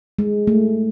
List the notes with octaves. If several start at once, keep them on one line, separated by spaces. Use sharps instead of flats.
G#3
A3